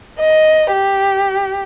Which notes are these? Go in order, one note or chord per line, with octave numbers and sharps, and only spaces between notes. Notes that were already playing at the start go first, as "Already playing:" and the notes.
D#5
G4